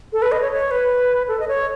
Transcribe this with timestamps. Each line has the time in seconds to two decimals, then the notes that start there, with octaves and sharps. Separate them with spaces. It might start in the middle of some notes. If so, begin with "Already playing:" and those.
0.13 A4
0.22 B4
0.32 D#5
0.42 C#5
0.52 C#5
0.71 B4
1.28 A4
1.40 D#5
1.48 C#5